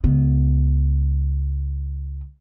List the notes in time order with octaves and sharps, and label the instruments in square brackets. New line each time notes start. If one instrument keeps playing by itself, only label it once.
[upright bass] C#2 B3